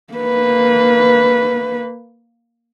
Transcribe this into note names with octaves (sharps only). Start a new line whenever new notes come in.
A#3 B4